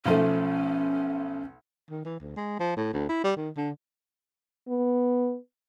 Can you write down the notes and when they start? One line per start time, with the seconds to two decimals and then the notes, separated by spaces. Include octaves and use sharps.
0.06 B1 F3 A3 C#4
1.90 D#3
2.05 E3
2.20 D2
2.36 G#3
2.59 F3
2.77 A2
2.93 D2
3.09 E4
3.24 G3
3.36 D#3
3.57 D3
4.68 B3